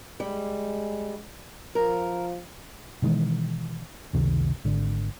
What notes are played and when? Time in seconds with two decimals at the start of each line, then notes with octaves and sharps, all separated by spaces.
0.20 G3 G#3
1.75 F3 A#4
3.02 B2 D#3 E3 G#3
4.13 F#1 C#2 C3 D#3
4.65 G#1 D3